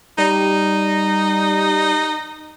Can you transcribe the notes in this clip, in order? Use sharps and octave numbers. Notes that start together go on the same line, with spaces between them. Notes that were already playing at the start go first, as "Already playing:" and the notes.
G3 D#4